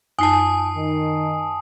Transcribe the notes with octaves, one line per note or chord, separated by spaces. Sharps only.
F#2 D#4 G#5 A5 D#6 C7
D#3